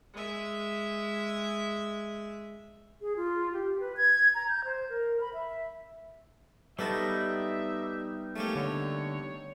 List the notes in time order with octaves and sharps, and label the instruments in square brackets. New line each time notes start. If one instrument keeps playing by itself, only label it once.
[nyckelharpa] G#3 E5
[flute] G#4
F4
G4
B4
G#6
A#5
G6
C5
A#4
B5
E5
[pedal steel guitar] G3 B3 D#4 [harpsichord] F#4 A4 B4 [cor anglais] E5
[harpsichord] A3 A#3 G4 [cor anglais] C#4
[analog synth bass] D3 [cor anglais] C#5